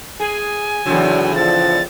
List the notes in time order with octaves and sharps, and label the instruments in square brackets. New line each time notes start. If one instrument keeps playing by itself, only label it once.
[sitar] G#4 [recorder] G#5
[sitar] E2 A2 C#3 [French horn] F#3
[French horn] F3 [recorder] A6